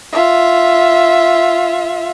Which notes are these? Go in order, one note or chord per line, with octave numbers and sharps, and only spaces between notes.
F4 E5